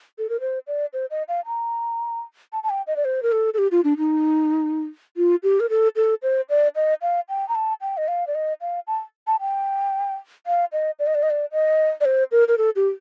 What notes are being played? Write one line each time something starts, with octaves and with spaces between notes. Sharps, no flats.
A4
A#4
C5
D5
C5
D#5
F5
A#5
A5
A5
G5
D#5
D5
C5
A#4
A4
A4
G4
F4
D4
D#4
F4
G4
A#4
A4
A4
C5
D5
D#5
F5
G5
A#5
A5
G5
D#5
F5
D5
D#5
F5
A5
A5
G5
F5
D#5
D5
D#5
D5
D#5
D5
D#5
D5
C5
A#4
A#4
A4
G4